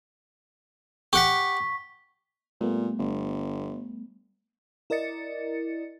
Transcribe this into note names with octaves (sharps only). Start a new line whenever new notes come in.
G4 F#5 C#6 B6
A#2 G3 A3 B3
G1
E4 A#4 D5 D#5 A6 C#7